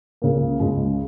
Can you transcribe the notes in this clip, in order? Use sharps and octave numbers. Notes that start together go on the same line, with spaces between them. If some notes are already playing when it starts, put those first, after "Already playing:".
C#2 C#3 A#3
C#2 C#3 G#3